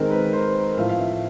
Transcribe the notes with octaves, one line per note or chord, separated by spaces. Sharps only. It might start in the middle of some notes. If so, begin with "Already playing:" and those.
Already playing: D#3 G#3 C4 A#4
B4
C5
A2 F3 A3 C4 F5
F5
E5